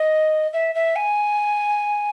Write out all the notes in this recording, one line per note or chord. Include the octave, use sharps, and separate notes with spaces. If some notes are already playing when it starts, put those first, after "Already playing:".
Already playing: D#5
E5
E5
G#5